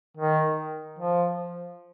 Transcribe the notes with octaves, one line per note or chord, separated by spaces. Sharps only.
D#3
F3